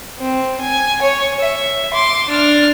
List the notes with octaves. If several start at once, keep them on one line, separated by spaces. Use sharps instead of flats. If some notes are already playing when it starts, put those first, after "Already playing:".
C4
G#5
C#5
E5
C6 D6
D4 F6